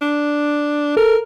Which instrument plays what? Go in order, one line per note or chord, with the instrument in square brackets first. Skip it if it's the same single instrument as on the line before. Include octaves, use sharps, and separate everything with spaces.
[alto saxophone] D4
[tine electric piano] A4 [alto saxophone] A#4